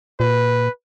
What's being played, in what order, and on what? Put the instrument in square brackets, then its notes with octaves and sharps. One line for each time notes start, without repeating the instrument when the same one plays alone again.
[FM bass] A#2 [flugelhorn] B4